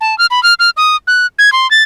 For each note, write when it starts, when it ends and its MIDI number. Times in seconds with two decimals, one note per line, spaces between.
0.01 0.17 81
0.18 0.26 89
0.31 0.42 83
0.43 0.54 89
0.59 0.70 89
0.77 0.96 87
1.07 1.26 90
1.39 1.52 92
1.52 1.69 84
1.71 1.83 93